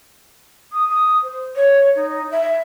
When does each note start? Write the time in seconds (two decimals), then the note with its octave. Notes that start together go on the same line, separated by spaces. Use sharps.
0.72 D#6
0.89 D#6
1.23 C5
1.56 C#5
1.95 D#4
2.31 E5